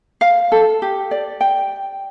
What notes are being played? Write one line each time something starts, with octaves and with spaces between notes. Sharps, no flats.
F5
A4
G4
D5
G5